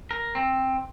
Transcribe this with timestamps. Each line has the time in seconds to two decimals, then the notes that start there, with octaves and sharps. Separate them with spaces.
0.11 A#4
0.35 C4